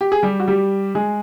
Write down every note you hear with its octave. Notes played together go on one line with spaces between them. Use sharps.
G4
G#4
G3 G4
F#4
G3 G4
G#3 G#4